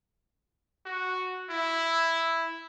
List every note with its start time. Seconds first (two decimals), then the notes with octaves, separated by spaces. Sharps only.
0.86 F#4
1.50 E4